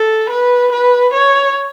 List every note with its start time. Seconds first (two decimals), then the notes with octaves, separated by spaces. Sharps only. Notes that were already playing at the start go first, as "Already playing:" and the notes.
Already playing: A4
0.29 B4
0.72 B4
1.13 C#5